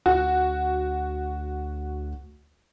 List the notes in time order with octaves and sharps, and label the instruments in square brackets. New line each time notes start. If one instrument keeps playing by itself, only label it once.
[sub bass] D2 [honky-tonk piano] F#4